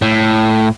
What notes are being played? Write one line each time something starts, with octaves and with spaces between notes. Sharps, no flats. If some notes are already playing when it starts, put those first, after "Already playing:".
A2